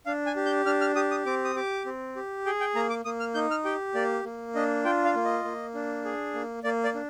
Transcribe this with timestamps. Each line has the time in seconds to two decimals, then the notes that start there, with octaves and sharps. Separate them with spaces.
0.06 D4 F5
0.26 G#5
0.36 G4
0.45 G6
0.66 D4 F6
0.81 F6
0.95 G4 D#6
1.11 D#6
1.26 C4 D6
1.45 D#6
1.55 G4 D6
1.86 C4
2.16 G4
2.46 G#4 G5
2.60 G5
2.75 A#3 A#5
2.90 D6
3.05 A#3 D#6
3.20 F6
3.35 D#4 G6
3.51 F6
3.65 G4 G5
3.95 A#3 D5
4.24 A#3
4.55 D4 D#5
4.84 F4 G5
5.05 F5
5.15 A#3
5.25 D#5
5.44 A#3
5.74 D4
6.05 G#4
6.34 A#3
6.64 A#3 D5
6.84 D5
6.95 D4